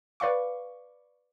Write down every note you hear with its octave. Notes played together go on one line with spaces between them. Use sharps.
B4 D5 F5 C#6